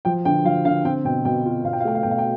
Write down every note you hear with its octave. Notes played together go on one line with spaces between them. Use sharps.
F3 G5
D3 G5
F3 F5
D3 F5
C4 G5
B2 G5
B2 G5
F4
B2 F5
G5
F5
A3 G5
F5
B2 G5
F5
G5